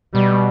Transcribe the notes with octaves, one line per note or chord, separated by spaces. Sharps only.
B2 G3